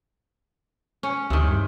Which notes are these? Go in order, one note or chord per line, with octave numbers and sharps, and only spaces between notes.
C#4
D2 C3 D#3
G2